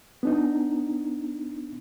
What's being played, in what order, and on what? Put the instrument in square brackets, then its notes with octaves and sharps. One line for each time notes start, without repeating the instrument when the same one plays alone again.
[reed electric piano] B3 D4 D#4